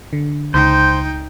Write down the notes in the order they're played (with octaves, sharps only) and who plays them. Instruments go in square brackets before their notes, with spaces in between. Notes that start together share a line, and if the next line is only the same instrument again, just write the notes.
[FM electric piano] D3
[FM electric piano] C#2 [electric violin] D#4 G5 [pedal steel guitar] C5